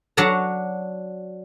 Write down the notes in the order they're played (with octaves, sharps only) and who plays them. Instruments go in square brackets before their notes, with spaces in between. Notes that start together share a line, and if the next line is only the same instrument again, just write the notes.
[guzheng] F#3 D4 F#5 A5 A#5